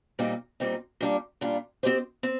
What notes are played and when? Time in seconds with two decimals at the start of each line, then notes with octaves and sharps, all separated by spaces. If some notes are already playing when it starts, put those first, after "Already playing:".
0.19 A#2 G3 C4 D#4
0.60 A#2 G3 C4 D#4
1.00 A#2 G3 D4 F4
1.41 A#2 G3 D4 F4
1.83 C4 G4 C5 D#5
2.23 C4